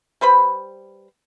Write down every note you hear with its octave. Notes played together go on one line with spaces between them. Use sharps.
G3 B4 C5 B5